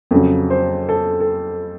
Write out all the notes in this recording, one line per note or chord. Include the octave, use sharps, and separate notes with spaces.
F2 C#3 F#3
C5
A4
A4